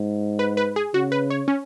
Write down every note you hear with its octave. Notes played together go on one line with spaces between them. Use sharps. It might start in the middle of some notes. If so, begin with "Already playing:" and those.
Already playing: G#2
B4
B4
G#4
C#3 F#4
B4
C#5
C#4